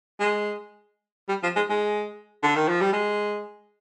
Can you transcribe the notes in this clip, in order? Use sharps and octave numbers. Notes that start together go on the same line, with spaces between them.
G#3
G3
F3
G#3
G#3
D3
D#3
F3
G3
G#3